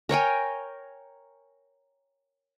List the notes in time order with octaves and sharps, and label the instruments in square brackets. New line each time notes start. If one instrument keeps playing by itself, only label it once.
[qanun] A#4 C#5 G5 G#5